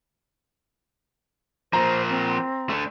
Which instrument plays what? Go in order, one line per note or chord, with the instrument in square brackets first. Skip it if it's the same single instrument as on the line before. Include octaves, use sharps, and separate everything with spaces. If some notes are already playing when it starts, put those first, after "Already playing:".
[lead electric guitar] F3 A#3 [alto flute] C5 [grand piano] A#5
[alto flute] C4
[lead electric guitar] A3 D4